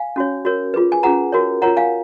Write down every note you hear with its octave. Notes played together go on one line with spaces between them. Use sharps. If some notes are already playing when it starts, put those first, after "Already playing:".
Already playing: F5 G#5
C#4 F#4 C#5
F#4 A#4 C#5
F4 G#4 B4
G#5
C#4 F4 G#4 B4 F#5 A#5
F#4 A#4 C#5
F4 A#4 C#5 F#5 A#5
F5 G#5